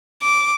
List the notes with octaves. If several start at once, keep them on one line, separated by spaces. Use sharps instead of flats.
D6